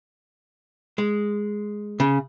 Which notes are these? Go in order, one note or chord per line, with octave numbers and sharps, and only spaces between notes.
G#3
C#3